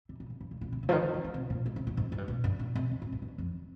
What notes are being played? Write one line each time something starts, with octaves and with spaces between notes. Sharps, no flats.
C3
A#2
G2
G2
A#2
A#2
C3
C#3
F3
D#3
F3
F3
D#3
C3
A#2
G#2
C3
A#2
G#2
G#2
G2
A#2
G2
A#2
C3
C#3
G#2
G#2
G2
F2